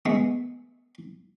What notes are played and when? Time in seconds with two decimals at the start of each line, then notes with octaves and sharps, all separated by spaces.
0.06 G#3 A3 B3